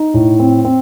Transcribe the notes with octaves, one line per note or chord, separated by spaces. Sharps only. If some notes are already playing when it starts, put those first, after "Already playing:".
Already playing: D#4
A2
C4
C4